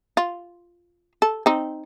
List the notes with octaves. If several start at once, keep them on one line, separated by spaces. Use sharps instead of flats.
F4
A4
C4 D#4